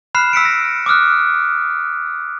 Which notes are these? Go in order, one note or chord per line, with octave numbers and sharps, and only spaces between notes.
B5 F6 F#6 C7 E7
E6 B6 C#7 D7
A#6
D6 D#6 F6 F#6